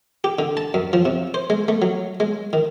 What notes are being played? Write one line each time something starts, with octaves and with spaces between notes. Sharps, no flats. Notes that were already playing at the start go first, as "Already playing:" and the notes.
G4
D3
A5
F#2
F3
C3
C5
G#3
A3
F#3
G#3
D#3